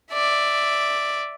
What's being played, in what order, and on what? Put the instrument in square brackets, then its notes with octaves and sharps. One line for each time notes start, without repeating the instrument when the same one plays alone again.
[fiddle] D5 E5